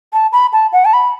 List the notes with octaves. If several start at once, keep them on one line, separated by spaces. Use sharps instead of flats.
A5
B5
A5
F#5
A5
B5